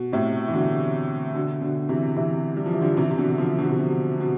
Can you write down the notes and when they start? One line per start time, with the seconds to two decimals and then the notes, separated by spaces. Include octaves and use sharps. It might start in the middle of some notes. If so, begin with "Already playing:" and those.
Already playing: B2
0.12 A2 C3
0.48 E3
0.54 B2 D3
1.34 B2 D3
1.62 B2 D3
1.89 C3 E3
2.16 C3 E3
2.57 G3
2.66 F3
2.73 E3
2.81 D3 F3
2.97 C3 E3
3.10 C3
3.18 B2 D3
3.38 D3 F3
3.58 B2 D3
3.69 C3
3.79 B2
4.20 B2